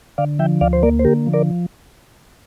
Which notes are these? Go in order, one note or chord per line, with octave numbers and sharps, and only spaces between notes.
D3 D5 F5
F3 E5 G5
D2 D5 F5
C5
A#3 A#4 D5
C5
D3 G4 A#4
F3
A#4 D5